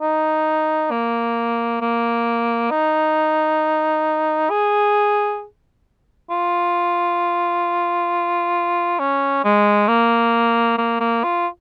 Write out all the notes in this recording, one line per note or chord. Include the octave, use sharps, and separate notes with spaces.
D#4
A#3
A#3
D#4
G#4
F4
C#4
G#3
A#3
A#3
A#3
F4